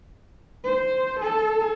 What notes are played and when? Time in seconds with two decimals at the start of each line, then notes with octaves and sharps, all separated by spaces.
0.64 C5
1.20 A4